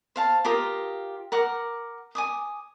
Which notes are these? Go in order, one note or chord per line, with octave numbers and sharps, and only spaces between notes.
C5 F5 A5
F4 G4 A#4 D#6
A#4 F#5 D6
G#5 D6 D#6